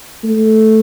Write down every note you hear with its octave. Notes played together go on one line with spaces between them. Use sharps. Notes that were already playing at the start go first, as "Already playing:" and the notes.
A3